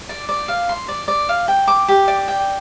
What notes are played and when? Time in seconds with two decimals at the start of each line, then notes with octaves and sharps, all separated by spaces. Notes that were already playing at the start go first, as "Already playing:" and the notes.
0.09 D5
0.29 D5
0.48 F5
0.69 C6
0.88 D5
1.08 D5
1.29 F5
1.48 G5
1.68 D6
1.88 G4
2.08 D5
2.28 G5